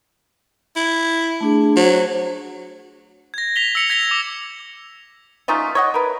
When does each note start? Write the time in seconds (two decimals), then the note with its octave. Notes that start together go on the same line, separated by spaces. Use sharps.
0.76 E4
1.41 A3 D4 G#4
1.76 F#3 C5
3.34 G#6 A#6
3.56 B6 F7 G7
3.75 E6 C#7 F7
3.90 G#6 A#6 B6 F7 G7
4.09 D6 F7
5.48 A3 C#4 D#4 F4
5.75 C#5 D#5 F#5
5.94 A#4 B4